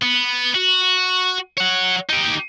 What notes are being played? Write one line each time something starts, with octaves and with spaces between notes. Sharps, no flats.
B3
F#4
C#5 F#5
D#4 G4